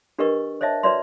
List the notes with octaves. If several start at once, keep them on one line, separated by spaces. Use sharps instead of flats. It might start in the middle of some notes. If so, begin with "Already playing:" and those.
D4 G4 A#4 B4 D#5 C#6
C5 C#5 D#5 E5 A5
F#4 B4 C#5 D5 E5 C6